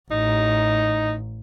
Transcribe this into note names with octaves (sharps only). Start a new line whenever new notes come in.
A1 D#4